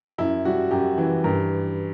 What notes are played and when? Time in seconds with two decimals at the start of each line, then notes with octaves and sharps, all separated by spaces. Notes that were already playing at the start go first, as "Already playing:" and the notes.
0.18 F#2 E4
0.45 G3 F#4
0.71 F#2 G4
0.98 E3
1.24 G2 A#4